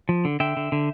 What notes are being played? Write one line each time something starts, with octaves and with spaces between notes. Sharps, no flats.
F3
D3
D3 E5 G5
D3
D3